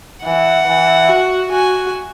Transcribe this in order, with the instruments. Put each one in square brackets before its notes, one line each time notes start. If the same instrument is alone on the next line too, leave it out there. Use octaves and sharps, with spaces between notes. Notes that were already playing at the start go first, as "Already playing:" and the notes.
[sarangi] E3 [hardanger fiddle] F#5
[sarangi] E3
F#4
[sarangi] F#4 [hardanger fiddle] G#5